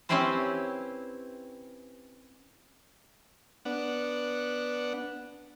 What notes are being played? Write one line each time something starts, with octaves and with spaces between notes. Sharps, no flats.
C4 C#4 E4 G4 B4 C5
B3 D4 F#5